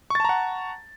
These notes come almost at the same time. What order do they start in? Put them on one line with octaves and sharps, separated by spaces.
C#6 A6 A5 A#5 F#5